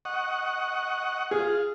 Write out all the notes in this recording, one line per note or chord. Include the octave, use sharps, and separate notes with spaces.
D#5 F#5 C#6
F4 G#4